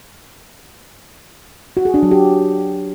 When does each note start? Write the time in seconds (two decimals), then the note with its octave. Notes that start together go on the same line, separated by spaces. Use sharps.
1.77 F#4
1.85 G#4
1.94 D4
2.03 F#3
2.11 G4